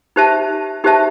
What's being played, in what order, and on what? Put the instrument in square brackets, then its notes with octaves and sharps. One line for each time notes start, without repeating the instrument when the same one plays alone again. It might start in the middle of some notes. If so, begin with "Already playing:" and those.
[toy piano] D#4 G4 C5 E5 A5
D#4 G4 C5 E5 A5